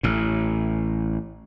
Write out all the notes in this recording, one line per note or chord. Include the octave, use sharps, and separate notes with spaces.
A1 A2